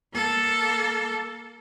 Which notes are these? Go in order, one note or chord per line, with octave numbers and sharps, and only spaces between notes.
A#3 A4